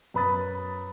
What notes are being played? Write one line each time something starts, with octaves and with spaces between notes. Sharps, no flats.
F#2 B4 B5 D#6 A6